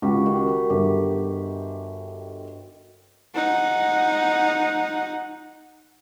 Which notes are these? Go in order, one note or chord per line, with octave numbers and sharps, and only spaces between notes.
C#2 F#4 G4
D#3
G1 G4
D#4 F#5